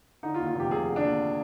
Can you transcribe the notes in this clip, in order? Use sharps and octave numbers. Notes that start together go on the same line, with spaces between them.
D3 D#4
F4
D#2
F4
F1 G4
F1 G#4
D3
D4
D#2